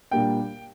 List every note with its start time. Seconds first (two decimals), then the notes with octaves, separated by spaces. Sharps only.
0.11 A#2 G3 A#3 D4 G5